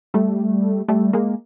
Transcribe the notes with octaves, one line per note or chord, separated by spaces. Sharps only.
G3 A3
G3 A3
G#3 A#3